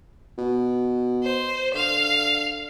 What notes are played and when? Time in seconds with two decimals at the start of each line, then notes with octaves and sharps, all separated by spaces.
0.38 B2
1.23 C5
1.74 D3 F5